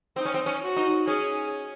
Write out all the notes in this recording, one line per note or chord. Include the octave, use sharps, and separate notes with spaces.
C4 D#4
C#4
C4
C#4
F#4
D#4
C#4 G#4